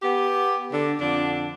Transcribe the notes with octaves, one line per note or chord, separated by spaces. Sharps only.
B3 G4
D3
F2 D3 D4